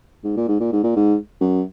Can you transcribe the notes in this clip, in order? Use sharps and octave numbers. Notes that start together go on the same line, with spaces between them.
G#2
A#2
G#2
A#2
G#2
A#2
G#2
F#2